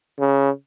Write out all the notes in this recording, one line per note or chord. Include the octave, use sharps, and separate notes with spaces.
C#3